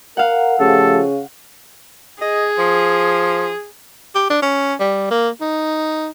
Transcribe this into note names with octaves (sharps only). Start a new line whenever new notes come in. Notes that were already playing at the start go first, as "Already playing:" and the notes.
A#4 F5 F#5
C#3 F3 A3 G4 A4
G#4 D#5
F3
G4
D4
C#4
G3
A#3
D#4